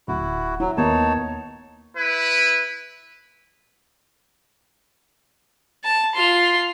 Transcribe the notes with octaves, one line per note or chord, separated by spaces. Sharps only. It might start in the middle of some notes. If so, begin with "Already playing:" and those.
D1 E4 F#4
F#3 E4
D#2 A#3 B3 D#4 C#5 A5
E4 B4
A5
F4 C6